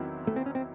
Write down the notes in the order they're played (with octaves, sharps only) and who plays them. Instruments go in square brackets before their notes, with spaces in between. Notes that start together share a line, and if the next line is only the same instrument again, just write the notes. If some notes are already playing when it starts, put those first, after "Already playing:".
Already playing: [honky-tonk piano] E2 D#3 F#3 C4 E4
[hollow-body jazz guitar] A3
C4
C#4
C4